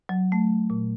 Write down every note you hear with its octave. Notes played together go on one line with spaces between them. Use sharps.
F#3
A3
A#2